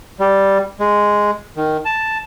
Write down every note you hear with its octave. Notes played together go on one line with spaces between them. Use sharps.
G3
G#3
D#3
A5